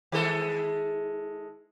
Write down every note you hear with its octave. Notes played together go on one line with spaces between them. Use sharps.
D#3 G#3 A4